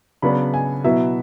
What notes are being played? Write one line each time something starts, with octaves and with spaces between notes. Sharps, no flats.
C#3 F#3 B3 D4 B5
G#5
B2 F#3 B3 E4 E5